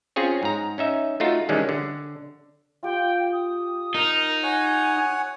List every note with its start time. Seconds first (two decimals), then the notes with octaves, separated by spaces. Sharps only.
0.16 C4 C#4 F4 G#4 C#5
0.43 G#2 A#5
0.78 C#4 D#4 E5
1.20 A3 D#4 F4 F#4
1.49 D#3 E3 G3 G#3 C#4 D4
1.69 D3
2.83 F4 G4 G5
3.32 D#6
3.94 D#4 A#4
4.43 C#5 F#5 G#5